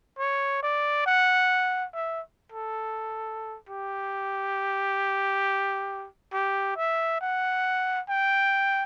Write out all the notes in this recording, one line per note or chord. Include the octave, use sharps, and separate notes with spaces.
C#5
D5
F#5
E5
A4
G4
G4
E5
F#5
G5